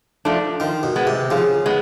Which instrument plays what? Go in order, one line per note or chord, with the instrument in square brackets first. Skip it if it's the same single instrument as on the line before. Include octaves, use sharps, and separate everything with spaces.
[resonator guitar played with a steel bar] F3 A3 D4
[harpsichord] D#3 [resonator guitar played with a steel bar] F3
[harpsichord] B2
[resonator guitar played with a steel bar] G#3 B3
[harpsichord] C3
[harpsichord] C#3 [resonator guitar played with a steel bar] F3
[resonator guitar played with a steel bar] G#3 B3